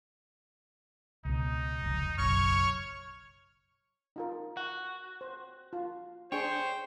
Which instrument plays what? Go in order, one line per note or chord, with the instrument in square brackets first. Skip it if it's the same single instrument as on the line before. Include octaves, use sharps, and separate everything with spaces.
[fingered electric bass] C#2 B2 [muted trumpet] D#4
[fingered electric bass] F1 C#2
[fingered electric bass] F#1 B1 [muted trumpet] C#5 [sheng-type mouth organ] C#6 F6
[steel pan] D#4 F4 A#4
[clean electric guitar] F#4 [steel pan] F#5
[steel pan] C5
F4
[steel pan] D4 G#4 [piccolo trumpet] C5 [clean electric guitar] C#5 [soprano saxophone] G5